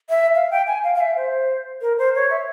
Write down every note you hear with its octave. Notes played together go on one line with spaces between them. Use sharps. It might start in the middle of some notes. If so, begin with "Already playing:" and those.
E5
F5
G5
G#5
F5
F5
E5
C5
A#4
C5
C#5
E5